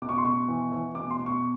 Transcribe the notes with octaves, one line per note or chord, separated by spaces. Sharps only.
B2 D6
C#6
C6
B2 C#6
E3
E3
B2 D6
C6
B2
C#6